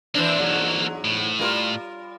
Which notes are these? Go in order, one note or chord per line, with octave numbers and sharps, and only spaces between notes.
E3 A#3 C4 D4 A4
E2 G#2 F#3
A2
G3 F4 A#4